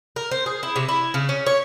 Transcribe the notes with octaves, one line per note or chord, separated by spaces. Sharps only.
A#4
C5
G#4
E4
C3
E4
C#3
C#4
C#5